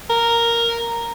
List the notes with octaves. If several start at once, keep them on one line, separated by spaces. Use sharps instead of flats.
A#4